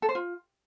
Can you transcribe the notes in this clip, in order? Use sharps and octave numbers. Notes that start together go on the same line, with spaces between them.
A4
C5
F4